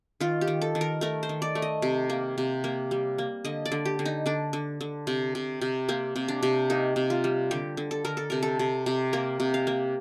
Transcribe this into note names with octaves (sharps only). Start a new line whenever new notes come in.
D#3 F4
G4
D#3
A4
D#3
A#4
A3 A#4
C5
D#3
D5
A3
D#5
C3
A#3
C3
A#3
G3
A#3
D3 D#5
D5
D3
G4
D3
D#4
D3 D4
D3
D3
C3
C3
C3
A#3 C4
C3
D4
C3
A#3 D#4
C3
F4
G3
D3 G4
D3
A4
D3 A#4
A4
C3 A#4
A4
C3
C3
A#3 A#4
C3
F5
A#3